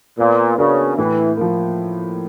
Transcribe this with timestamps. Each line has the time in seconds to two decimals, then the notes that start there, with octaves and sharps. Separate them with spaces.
0.18 A#2 B3
0.58 C#3 D4 F#4 A#4 D5
0.97 A2 E3
1.37 F3 A#3